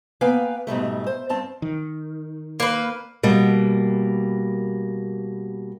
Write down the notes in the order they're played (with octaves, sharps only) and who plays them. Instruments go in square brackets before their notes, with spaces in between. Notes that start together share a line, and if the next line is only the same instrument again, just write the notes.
[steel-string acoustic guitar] A#3 B3 B4 F5 G5 G#5
G#2 B2 G3 A3
C5
G2 C4 A5
[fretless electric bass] D#3
[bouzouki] A#3 B4
[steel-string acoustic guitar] B2 G3 A#3